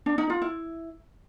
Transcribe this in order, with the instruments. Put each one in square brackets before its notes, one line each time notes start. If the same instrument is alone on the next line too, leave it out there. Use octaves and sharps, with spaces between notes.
[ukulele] D4
D#4
F4
E4